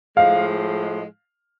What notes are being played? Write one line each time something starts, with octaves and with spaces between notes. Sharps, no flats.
A2 F3 G#3 F5